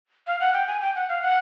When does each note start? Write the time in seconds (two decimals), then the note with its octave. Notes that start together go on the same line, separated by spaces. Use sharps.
0.27 F5
0.40 F#5
0.54 G5
0.67 G#5
0.81 G5
0.95 F#5
1.09 F5
1.22 F#5